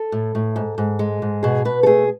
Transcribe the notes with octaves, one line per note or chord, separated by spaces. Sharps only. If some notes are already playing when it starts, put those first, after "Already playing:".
Already playing: A4
A2
A2
G#2
G#2
G#3
G#2
B2 G#4
B2 B4
A4
A3 G#4